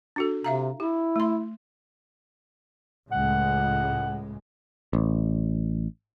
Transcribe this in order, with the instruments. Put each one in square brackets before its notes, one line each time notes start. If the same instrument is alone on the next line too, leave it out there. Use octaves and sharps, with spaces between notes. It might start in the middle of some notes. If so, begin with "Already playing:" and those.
[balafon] D4 F#4 A4
[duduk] C3 [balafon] E5 F5 A#5
[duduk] E4 [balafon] G4
[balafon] A3 C6
[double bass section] C#2 A2 G#3 [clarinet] F#5
[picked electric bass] A1